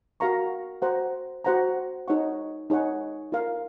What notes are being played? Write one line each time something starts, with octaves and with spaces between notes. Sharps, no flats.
F#4 A#4 F5 A#5 C#6
F#4 C5 F#5 A#5
F#4 C5 F#5 A#5
D#4 G#4 C#5 F#5 C#6
D#4 G#4 C#5 F#5 C#6
F4 A#4 F5